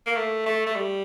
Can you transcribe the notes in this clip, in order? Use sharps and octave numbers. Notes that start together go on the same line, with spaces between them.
A#3
A3
A3
A3
G3